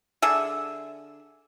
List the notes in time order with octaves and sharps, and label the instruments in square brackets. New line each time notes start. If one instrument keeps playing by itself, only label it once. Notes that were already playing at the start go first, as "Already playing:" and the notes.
[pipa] D3 G#4 E5